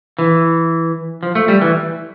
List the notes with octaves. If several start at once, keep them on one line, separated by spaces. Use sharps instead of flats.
E3
F3
A3
G3
E3